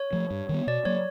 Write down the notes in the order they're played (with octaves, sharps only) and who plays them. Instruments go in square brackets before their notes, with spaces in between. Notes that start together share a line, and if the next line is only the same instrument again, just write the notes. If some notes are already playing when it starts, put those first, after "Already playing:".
Already playing: [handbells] C#5
[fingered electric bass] F3 A3
G2
D#3 G3 B3
[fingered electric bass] B2 [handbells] D5
[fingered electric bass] F#3 A#3 [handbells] C#5